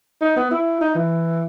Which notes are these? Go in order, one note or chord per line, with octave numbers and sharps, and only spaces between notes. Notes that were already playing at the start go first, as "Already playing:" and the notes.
D#4
B3
E4
D#4
E3